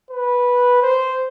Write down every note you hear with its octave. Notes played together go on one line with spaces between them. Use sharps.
B4
C5